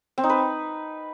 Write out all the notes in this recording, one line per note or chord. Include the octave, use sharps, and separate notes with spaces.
C4
D#4
B4